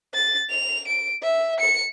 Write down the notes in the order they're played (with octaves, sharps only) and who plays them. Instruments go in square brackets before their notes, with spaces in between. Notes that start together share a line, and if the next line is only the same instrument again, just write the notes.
[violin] A6
F7
D7
E5
C#7